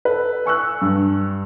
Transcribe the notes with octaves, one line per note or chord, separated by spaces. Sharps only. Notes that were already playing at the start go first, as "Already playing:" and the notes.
A4 B4
G#5 C#6 E6 F#6
G2